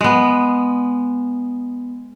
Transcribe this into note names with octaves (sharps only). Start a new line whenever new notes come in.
G#3 B3